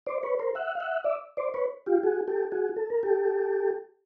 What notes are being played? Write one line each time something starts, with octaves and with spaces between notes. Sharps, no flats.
C5 D5
B4 C#5
A#4 C5
E5 F#5
F5
E5 F#5
D5 E5
C5 D5
B4 C#5
F4 G4
F#4 G#4
G4 A4
F#4 G#4
A4
A#4
G4 A4